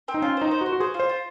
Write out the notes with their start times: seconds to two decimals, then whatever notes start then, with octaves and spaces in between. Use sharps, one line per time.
0.08 C4
0.14 D#4
0.22 C#4 F4
0.37 D#4 C5
0.51 C5
0.61 F#4
0.66 C5
0.72 F#4
0.80 G#4 C5
0.94 F4
0.99 C5
1.10 F4